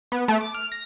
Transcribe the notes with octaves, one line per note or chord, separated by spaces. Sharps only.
B3
A3
D6
F6
A#6